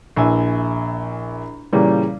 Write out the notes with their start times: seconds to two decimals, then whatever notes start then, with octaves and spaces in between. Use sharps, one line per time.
0.16 A#1 E4 G#5 E6
1.73 A#2 C#3 E3 G3